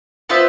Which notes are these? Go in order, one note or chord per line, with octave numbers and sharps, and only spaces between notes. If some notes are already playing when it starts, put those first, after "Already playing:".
B3 F4 C5 E5